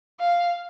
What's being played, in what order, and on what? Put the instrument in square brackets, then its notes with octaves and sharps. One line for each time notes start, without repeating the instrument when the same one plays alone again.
[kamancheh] F5